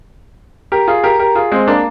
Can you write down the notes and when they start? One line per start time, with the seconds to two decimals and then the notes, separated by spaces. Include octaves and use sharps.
0.72 G4 A#4
0.88 F4 G#4
1.04 G4 A#4
1.19 G4 A#4
1.35 F4 G#4
1.52 G#3 C4
1.67 A#3 D4